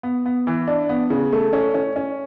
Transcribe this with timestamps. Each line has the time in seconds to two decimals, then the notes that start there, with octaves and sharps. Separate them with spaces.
0.03 B3
0.26 B3
0.47 E3
0.68 D4
0.89 B3
1.10 C#3
1.33 A3
1.53 C#4
1.74 C#4
1.96 C#4